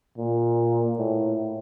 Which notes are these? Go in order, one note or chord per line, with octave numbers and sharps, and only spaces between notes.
A#2
A2